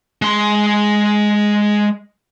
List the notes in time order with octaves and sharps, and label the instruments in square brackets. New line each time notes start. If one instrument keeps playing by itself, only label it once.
[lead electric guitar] G#3 C6